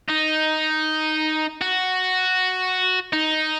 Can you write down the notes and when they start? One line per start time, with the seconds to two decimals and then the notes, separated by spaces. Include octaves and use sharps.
0.10 D#4
1.61 F#4
3.13 D#4